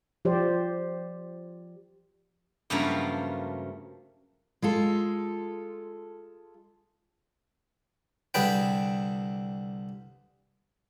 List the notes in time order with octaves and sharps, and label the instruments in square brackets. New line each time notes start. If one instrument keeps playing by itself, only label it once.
[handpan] F3 G4 C5 D5
[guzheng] G2 C#3 F3 F#3 A3 A#3
[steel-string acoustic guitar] G#3 F4 A4
[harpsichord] C2 D3 G#4 B4 G5